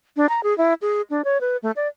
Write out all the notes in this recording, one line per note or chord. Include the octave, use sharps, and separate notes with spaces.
D4
A#5
G#4
E4
G#4
D4
C#5
B4
A3
D5